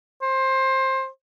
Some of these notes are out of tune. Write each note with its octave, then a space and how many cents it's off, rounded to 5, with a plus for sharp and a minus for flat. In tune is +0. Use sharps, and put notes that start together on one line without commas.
C5 +20